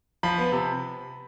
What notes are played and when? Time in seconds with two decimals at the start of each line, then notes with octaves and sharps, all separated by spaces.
0.23 F3 B5
0.38 B3
0.52 C3